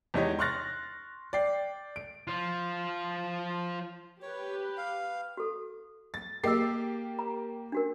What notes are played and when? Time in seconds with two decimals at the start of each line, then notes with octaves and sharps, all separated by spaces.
0.14 E2 G#3 D#4 G4 C#5 D#5
0.39 C6 C#6 F6 F#6 A6 A#6
1.33 D5 G5 C7
1.96 D7
2.27 F3 F4
4.22 G4 B4 C#5
4.77 F5
5.37 F#4 A4
6.14 A6
6.44 A#3 G4 G#4 D#5 E6 C7
7.19 A#5
7.72 D4 F#4 A#4